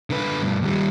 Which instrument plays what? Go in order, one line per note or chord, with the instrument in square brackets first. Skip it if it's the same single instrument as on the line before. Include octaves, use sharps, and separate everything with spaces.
[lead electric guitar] D3 B4
G2 B2
D#2 G3